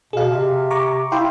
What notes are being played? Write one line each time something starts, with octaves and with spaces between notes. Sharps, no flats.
B2 G#4 F5
C3
A#5 C#6 D6
E4 F5 G5 C6